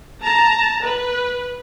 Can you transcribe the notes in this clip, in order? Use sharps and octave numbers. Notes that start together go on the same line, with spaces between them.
A5 A#5
B4